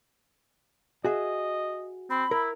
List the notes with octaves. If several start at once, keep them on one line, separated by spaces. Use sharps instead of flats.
F#4 G#4 D#5 E5
C4 B5
E4 A#4